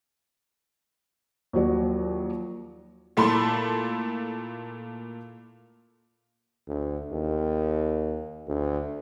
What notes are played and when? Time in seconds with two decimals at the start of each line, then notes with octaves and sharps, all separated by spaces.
1.53 D#2 F3 F#3 D5
3.17 A#2 A3 E4 B5 C6
6.68 D2
7.12 D#2
8.48 D2